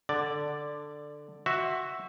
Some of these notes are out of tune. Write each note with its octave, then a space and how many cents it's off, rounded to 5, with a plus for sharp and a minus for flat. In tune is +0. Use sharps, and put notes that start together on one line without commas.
D3 +5 D5 +0
F#4 +0 C5 +30 E5 +0